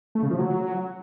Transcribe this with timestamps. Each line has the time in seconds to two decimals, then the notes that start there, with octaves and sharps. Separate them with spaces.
0.15 A3
0.23 C#3
0.30 F3
0.38 F#3